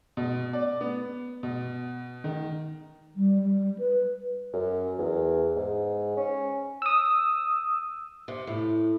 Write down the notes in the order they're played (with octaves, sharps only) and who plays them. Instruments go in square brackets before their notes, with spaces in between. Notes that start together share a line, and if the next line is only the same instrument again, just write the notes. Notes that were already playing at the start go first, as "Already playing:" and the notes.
[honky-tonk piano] B2
D5
B3
B2
D#3
[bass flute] G3
G3
B4
[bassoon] F#2
E2
G#2
C#4
[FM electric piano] D#6 E6
[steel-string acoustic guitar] C3
A2